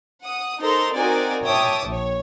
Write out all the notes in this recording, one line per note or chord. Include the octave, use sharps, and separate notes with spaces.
F#5 D#6
D#4 A4 A#4 C5 A#5 C6
C4 D#4 F#4 A#4 D5 G#5
C#5 E5 G5 A5 D6 D#6
A#1 C#5